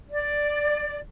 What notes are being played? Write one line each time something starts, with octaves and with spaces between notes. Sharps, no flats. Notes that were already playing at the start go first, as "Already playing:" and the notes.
D5